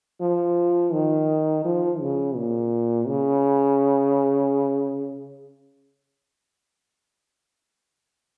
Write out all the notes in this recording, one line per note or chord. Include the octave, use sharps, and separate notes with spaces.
F3
D#3
F3
C#3
A#2
C#3